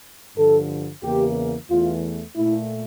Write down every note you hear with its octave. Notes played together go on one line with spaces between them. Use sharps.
G2 D3 F3 A4
E2 C#3 E3 A#3 G4
E2 E3 A3 F4
A#2 A3 E4